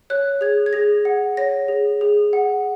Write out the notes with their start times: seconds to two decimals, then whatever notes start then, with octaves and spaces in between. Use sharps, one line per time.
0.10 C#5 F#6
0.41 G#4 G#6
0.66 G#6
0.73 G#4 A#6
1.05 F#5
1.37 C#5 A#6
1.68 G#4
2.01 G#4
2.33 F#5